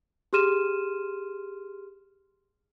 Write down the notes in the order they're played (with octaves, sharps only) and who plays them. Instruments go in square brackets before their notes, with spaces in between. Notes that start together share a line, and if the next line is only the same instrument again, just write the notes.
[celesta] G4 G#4 C6 F6 D#7 E7